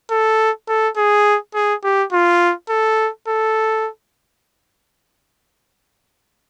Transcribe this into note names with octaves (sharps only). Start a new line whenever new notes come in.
A4
A4
G#4
G#4
G4
F4
A4
A4